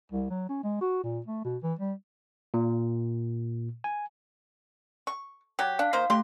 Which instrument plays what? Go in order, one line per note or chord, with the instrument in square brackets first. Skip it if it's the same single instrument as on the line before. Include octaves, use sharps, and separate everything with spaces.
[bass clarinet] C2
F#3
C#4
G#3
F#4
A#2
A3
B2
E3
G3
[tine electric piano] A#2
G#5
[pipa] C#6
F#3 G4
[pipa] D4 [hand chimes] F5
[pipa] D#3 A#3 C5
[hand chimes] A3 [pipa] G4 C6